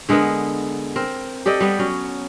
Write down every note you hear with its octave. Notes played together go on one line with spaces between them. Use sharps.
D3 G#3 B3 A#4
C4 A#4
G4 A4 D5 D#5
G3 B3 D5
F#3 C#4